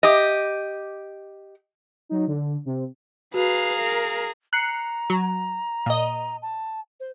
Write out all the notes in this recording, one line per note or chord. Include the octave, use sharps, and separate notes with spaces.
G4 D#5
F#3 D#4
D3
C3
F#4 G#4 B4 F5 A#5
A#4
A#5 F#6 C7 C#7
F#3
A#2 D#5
A5
C5